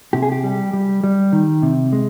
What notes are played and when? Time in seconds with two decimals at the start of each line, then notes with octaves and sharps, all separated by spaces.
0.13 C3 G4
0.22 G#4
0.32 G4
0.44 G3
0.73 G3
1.04 G3
1.33 D#3
1.63 C3
1.93 G#3